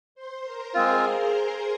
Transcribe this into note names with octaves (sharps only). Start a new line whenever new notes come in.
C5 C6
A#4 A#5
G#3 C4 F4 G#4 G#5
A#4 A#5